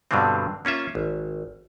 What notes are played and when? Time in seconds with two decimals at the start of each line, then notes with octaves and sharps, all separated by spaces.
0.11 G2 B2 D3 F#3 G3 C4
0.65 A#3 C#4 F4 E5
0.95 G#1